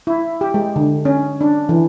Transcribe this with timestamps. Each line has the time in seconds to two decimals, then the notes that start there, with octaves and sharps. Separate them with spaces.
0.07 E4
0.41 G4
0.54 G#3
0.76 D3
1.05 C#4
1.41 D4
1.69 E3